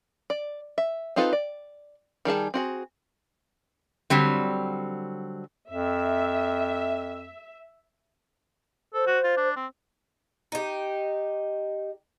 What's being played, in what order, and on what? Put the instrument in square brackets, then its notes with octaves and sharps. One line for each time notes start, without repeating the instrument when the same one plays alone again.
[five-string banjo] D5
E5
C4 D#4 F4 A4 B4
D5
D#3 G3 G#4 A5
C4 F#4 G#4
[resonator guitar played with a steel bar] D3 F#3 G3 C4
[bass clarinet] F2 [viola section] E5
[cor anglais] A4 [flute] C5
[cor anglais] F#4
F4
D4
C4
[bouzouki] D#4 G4